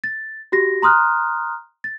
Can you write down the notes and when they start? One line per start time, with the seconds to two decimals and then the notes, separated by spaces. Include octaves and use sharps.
0.04 A6
0.52 F#4 G4 A#6
0.82 A#5 C6 D#6 F6 F#6
1.84 A6